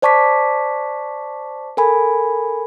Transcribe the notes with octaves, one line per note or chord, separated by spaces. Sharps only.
C5 D5 A5 C#6 D6 B6
A4 A#4 G#5 B5